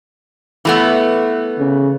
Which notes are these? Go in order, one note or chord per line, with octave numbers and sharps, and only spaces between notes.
E3 A3 B3
C#3